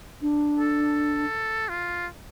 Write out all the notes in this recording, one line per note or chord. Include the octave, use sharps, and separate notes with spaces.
D4
A4
F4